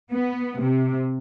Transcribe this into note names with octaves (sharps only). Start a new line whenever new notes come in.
B3
C3